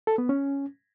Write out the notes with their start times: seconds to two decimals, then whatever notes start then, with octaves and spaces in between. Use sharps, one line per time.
0.07 A4
0.18 B3
0.29 C#4